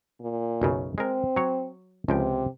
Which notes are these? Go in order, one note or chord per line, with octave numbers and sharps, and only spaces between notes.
A#2
B1 F#2 C#3
G#3 C4 A#4
F#3 C#5
C#2 C3 F3 G5